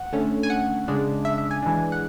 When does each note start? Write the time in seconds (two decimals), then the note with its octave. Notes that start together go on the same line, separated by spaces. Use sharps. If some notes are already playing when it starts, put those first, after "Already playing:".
Already playing: F#5
0.12 D3 A3 C#4
0.43 G#5
0.50 F#5
0.88 C#3 G#3 D4
1.25 E5
1.38 E5
1.51 G#5
1.62 E3 G#3 D4
1.92 F#5